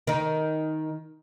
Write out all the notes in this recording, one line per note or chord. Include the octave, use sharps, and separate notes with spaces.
D#3 D#4